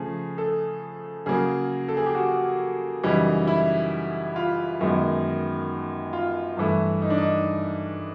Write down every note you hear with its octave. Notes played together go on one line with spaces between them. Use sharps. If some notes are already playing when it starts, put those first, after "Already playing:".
Already playing: C#3 F3 A3 G#4
A4
C#3 F#3 A#3 G#4
A4
G#4
G4
F#4
F#2 C#3 E3 G3 D#4
E4
F4
F#2 D#3 G#3 B3
F4
G2 E3 A3
D#4
D4
D#4